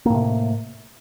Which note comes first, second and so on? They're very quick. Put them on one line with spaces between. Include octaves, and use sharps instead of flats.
A#3 A2 C3